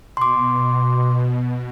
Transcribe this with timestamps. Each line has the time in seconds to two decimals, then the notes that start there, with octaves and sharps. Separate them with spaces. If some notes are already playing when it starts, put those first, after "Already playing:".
0.17 B2 C6 D6